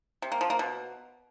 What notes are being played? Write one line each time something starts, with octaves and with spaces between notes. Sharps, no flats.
C3
A#3
F3
A#3
B2